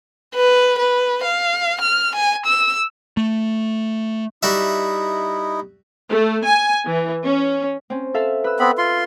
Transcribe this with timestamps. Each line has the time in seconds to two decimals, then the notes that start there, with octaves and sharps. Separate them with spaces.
0.35 B4
0.79 B4
1.24 F5
1.81 F6
2.15 G#5
2.46 E6
3.17 A3
4.43 G3 D#4 E4 F#4 E5
6.08 A3
6.44 G#5
6.85 E3
7.24 C#4
7.90 C4 C#4
8.14 A4 E5 F5
8.44 B4 E6
8.59 B3 C4 B5
8.78 F4 C6